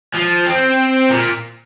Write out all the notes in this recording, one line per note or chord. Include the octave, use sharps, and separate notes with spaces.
F3
C4
A#2